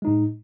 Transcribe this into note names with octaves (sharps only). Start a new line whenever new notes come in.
A2 G#3 D#4